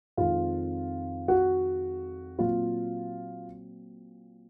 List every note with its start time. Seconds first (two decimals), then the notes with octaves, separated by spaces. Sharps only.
0.17 F2 D#3 G#3 C4 F4 F5
1.28 F#4 F#5
2.39 A#2 F#3 C4 F4 F5